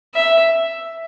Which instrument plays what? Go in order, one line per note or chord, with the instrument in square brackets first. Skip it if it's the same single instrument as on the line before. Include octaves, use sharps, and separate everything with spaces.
[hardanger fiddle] E5